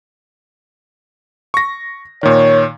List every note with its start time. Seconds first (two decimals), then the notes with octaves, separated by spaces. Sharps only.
1.54 C#6 A#6
2.23 A#2 D#3 C#5